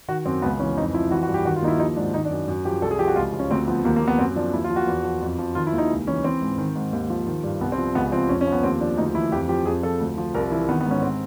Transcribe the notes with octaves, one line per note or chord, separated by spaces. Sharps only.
D#3 F#4
F#2 C4
C#2 B3
E3 C#4
F2 D#4
F3 E4
E3 F#4
F#4
G2
G4
D#3 F#4
F4
D#2 D#4
E4
F3 D#4
G#2 D4
D#3 D#4
D4
F#2
F#2
F3 G4
C2 A4
G#4
F3 G4
F#4
C#2 F4
F3
C#4
D2 C4
F3 B3
D#2 A#3
A#3
F3
B3
F#2 C4
F3 D4
D#2 E4
F4
F3
F#4
E2
F3
F2
F3
D#3 F4
E4
D#2
D#4
C#2
E3 C#4
E3 C4
G#2
D#3
G#2
D#2
F3
D#3
G2
C2 B3
C4
F3
C#2 B3
F3 C4
F2 C#4
C#4
F3
B3
D#2 C4
F3 D4
D2 D#4
E3 E4
F2 G4
F3 G4
F2 G#4
F3 A4
D2
F3
C2 A#4
E3 E4
D#3 B3
B3
G#2
C#4
C4